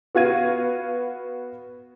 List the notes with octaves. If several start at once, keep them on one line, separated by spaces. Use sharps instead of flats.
B3 F#4 F5 G#6 D#7